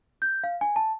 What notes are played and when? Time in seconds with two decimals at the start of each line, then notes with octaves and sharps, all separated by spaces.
0.22 G6
0.44 F5
0.61 G#5
0.76 A5